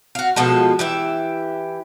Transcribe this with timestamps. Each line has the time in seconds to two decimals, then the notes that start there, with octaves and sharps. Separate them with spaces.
0.15 F#4 F5
0.36 B2 F3 G#3 A4
0.79 E3 G4 E5